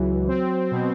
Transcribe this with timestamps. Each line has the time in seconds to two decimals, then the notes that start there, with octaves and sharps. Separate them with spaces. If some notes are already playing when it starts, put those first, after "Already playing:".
Already playing: C#2 E3 F#3
0.28 C4
0.71 B2